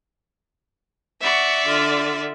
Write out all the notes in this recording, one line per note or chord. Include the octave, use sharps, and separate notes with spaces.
D5 E5 F#5 C#6
D3 F4